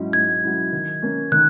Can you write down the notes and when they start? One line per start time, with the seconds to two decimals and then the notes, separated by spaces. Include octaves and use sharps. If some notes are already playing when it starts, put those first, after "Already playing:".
Already playing: G#2 F#3 C#4 E4
0.13 G#2 G#6
0.44 F#3 C#4 E4
0.72 D#3
1.02 A#3 C#4
1.32 D#3 F#6